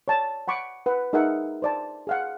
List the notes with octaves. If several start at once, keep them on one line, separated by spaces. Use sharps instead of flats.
C#5 D5 A5
F#5 B5 C#6 D6
B4 F#5
D#4 G#4 A#4 E5 F#5
C5 D5 A5
G#4 F5 F#5